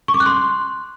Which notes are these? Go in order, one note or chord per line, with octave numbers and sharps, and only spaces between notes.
C#6
D6
F#6
C6